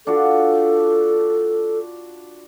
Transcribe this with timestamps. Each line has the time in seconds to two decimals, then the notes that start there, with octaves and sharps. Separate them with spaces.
0.07 D4 F4 F#4 A4